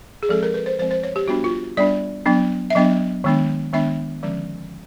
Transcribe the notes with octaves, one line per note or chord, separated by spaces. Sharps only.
G#4
F3 G#3 C4 A4
A#4
B4
C5
F3 G#3 C4 C5
C5
C#5
G4
G3 B3 D4 F#4
F4
G3 B3 D4 D5
F#3 B3 D4
E5
F#3 B3 D4 D#5
D#3 G#3 B3 D4
D#3 G#3 B3 D4 E5
D3 F3 G#3 C#4